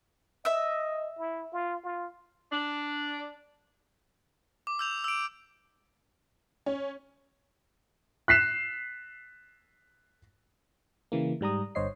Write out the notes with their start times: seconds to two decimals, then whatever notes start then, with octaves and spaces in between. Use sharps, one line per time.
0.45 D#5 E5 E6
1.19 E4
1.53 F4
1.84 F4
2.52 D4
4.67 D6
4.79 E6 G6 F7
5.04 E6 D7
6.66 C#4
8.28 F#6 B6 C7 E7
11.12 C#3 E3 A#3
11.41 G#2 G3 A#5 D#6
11.75 G1 G2 C5 C#5 D#5 C7